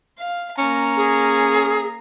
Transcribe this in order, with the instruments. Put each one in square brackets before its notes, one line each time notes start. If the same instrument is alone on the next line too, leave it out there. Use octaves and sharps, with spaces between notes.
[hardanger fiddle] F5
[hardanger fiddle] A#3 A#5 [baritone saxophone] C#4
[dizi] G#4